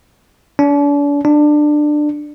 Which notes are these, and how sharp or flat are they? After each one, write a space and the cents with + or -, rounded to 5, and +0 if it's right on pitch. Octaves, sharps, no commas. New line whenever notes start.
D4 -40
D4 +20